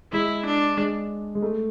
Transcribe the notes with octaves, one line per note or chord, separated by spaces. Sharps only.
G#3 E4
D4
G#3
G#3
A3